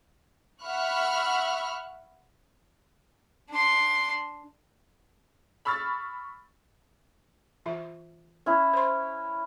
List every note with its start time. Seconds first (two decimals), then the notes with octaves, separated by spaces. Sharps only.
0.63 E5 F#5 B5 C#6 F6 F#6
3.50 D4 C6
5.65 B5 C#6 E6 F6 A6
7.66 E3 F4 E5
8.46 C#4 E4
8.73 C5 C6